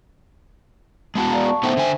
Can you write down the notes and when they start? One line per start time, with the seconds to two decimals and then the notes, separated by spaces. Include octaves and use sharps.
1.15 G#3 B3 F#4 A5
1.29 D5 F5 A#5
1.45 A5 C#6
1.63 A3 B3 D#4 C5 E5 G5
1.77 D3 G#5